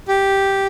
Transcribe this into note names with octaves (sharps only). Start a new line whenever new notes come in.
G4